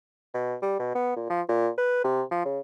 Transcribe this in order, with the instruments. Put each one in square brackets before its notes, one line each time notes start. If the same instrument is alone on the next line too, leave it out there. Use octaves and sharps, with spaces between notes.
[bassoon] B2
G3
B2
B3
A#2
F3
A#2
B4
C3
F3
C#3